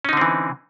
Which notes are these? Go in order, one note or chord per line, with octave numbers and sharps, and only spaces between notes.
D3 E3 C4 C#4 D#4